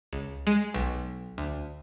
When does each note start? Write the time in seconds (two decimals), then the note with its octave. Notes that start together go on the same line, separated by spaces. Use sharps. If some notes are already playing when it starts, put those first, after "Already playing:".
0.13 C#2
0.47 G#3
0.74 B1
1.38 D2